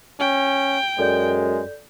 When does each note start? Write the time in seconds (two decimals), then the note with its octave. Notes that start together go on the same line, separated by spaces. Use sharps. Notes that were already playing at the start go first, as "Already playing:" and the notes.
0.20 C#4 G5
0.98 F#2 G#3 A4 D5 G6